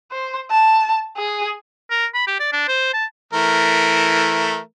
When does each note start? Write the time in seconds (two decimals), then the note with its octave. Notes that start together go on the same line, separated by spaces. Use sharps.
0.11 C5
0.50 A5
1.17 G#4
1.90 A#4
2.14 B5
2.27 G4
2.40 D5
2.52 D4
2.68 C5
2.93 A5
3.33 E3 A3 A#4